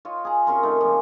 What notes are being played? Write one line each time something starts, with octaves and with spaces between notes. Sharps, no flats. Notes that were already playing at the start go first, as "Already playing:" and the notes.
F4 C#5 D#5
G#4 A#5
C3 C#4 A#4 C6
D#3 A3
C#3 F3 A#3